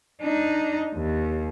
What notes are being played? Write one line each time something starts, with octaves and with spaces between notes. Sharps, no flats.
D4 D#4
D#2